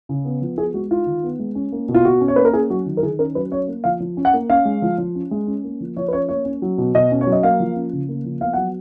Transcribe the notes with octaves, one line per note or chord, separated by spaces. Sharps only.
C#3
B3
F3
B3 G#4
G#3 F#4
D#4 F4
D#3
B3
G#3
C#4
A#3
B2
F4
B2 F#4
C#4
C#5
A#3 B4
A#4
C#4 G#4
F#3 F#4
D#3
A#4
D#3 G#4
C#4 A#4
F#3 B4
C#4 C#5
A#3
F3 F5
F3
C#4
F#5
A#3
C#4 F5
G#3
F3
F3
C#4
G#3
C#4
A#3
F3
F3 C#5
B4
C#4 C#5
A#3 C#5
C#4
F#3
B2
B2 D#5
C#4
C#5
F#3
D#5
A#3 F5
F3
C#4
C#3
A#3
F3
B3 F5
F#3 F#5